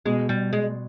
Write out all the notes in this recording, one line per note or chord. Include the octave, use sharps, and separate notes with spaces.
B2 G#3
G3
G#3